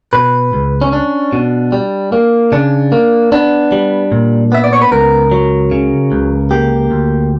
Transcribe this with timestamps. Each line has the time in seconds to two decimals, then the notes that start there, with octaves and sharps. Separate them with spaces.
0.13 B2 B4
0.53 C#2
0.82 C#4
0.92 C#4 D4
1.33 B2
1.72 G3
2.12 A#3
2.52 C#3 D4
2.92 A#3
3.32 B3 D4
3.72 G3
4.12 A#2
4.52 B3 E5
4.64 D5
4.73 C#5
4.82 B4
4.92 C#2 A#4
5.31 F#3
5.71 C#3
6.12 C#2
6.51 A#3 G4
6.91 D2